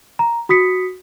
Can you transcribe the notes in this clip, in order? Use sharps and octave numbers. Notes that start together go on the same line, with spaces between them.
A#5
F#4 D#6 B6 C#7